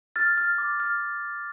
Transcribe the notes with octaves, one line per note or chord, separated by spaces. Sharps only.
F6 A6
F6
D6
F6